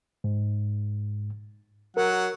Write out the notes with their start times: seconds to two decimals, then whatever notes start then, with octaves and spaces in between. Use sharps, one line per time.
0.24 G#2
1.97 F#3 A#4 F#5